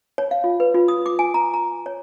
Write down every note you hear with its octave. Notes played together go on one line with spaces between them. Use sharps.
C#5
F5
F4
B4
F4
D#6
D6
G#5
A#5
A#5
C#5